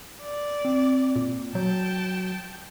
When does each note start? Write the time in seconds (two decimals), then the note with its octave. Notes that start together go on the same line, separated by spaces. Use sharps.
0.22 D5
0.65 C4
1.16 A#2
1.55 F#3 G5 A5 G6